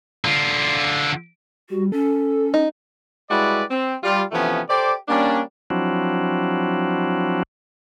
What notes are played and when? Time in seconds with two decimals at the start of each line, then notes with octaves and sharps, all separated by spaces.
0.25 D3 F4
1.70 G3 F#4
1.92 C#4 A4
2.54 D#4
3.30 G3 G#3 E4 F#4 B4 D5
3.70 C4
4.02 G3 F4
4.32 C3 E3 F3 A3 B3 C#4
4.69 G4 A4 C5 D5
5.08 G3 A#3 C#4 D4
5.70 F3 F#3 C4 D4 E4 F#4